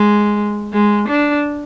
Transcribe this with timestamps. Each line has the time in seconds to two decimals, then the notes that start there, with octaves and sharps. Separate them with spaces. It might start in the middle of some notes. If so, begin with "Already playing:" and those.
Already playing: G#3
0.73 G#3
1.09 D4